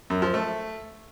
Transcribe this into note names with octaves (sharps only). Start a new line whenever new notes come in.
F#2
F3
A3